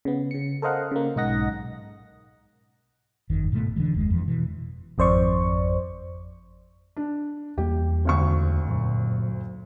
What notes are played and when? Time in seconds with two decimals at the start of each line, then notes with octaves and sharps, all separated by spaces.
0.05 C#3 B3
0.31 C#3 C#7
0.62 A4 A#4 C5 D#5 F5 F#5
0.91 C#3 A#3
1.16 B1 G#2 D#4 D#5 F#5 A#6
3.30 G1 F2 D#3
3.52 G#2 B2 F#3 A3
3.76 D3 E3 G3
3.94 F#1 D#2 G#3
4.10 F2 E3
4.28 B2 E3
4.98 G#1 F2 C5 D5 C#6
6.96 D4
7.58 E2 G3 A#3 G4
8.05 G#1 D2 C#6
8.68 F#2 A#2 F#3